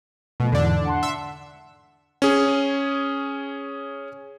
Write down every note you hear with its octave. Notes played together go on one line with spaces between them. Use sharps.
B2 F3 A3
E2 G#2 D3 D4
F#5 A5 C6
E5
C#4 G#4